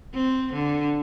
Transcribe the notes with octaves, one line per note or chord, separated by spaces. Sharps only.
C4
D3